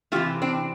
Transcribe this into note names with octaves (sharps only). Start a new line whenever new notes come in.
C3 E3 A3 F4 G4
C4 D4